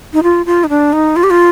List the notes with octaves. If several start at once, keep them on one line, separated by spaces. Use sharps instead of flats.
D#4
F4
F4
D#4
D4
D#4
F4
G4
F4